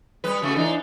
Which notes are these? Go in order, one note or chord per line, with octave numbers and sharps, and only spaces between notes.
G3 B4
C#3 A3 F#4
E3 D4 D#4